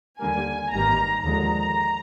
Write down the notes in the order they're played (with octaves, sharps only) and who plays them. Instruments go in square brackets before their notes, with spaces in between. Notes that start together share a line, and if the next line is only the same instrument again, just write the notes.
[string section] D#2 D3 G3 A#3 G#5
G#1 G2 D#3 G3 A#3 A#5
D#2 D3 F3 G#3 A#5